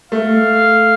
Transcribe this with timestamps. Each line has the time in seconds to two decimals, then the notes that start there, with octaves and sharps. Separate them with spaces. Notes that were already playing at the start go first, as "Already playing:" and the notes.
0.12 A3 F5